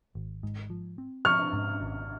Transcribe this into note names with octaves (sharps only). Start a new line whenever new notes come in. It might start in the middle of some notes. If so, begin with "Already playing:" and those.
G#1
G#2
F3
C4
F3 C#6 F6
G#2
G#1